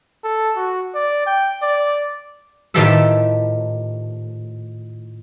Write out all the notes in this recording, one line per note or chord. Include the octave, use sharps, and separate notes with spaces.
A4
F#4
D5
G5
D5
A2 D#3 F3 G4 A4 E5